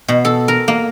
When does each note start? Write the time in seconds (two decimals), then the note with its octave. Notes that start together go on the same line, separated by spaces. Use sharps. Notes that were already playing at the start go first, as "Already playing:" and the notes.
0.08 B2
0.25 A4
0.48 A#4
0.68 A#3